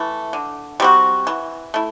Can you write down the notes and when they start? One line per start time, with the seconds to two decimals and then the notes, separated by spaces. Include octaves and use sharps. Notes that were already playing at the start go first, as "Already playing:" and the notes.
Already playing: E3 A3
0.33 D3
0.80 G3 C4 F#4
1.27 E3
1.74 A3 E4